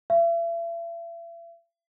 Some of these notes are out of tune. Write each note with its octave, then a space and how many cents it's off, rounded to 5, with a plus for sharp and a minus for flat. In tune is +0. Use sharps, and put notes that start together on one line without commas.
E5 +40